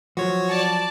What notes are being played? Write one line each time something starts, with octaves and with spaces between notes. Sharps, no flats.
F3 F#3 F#4 C#5
D5 A5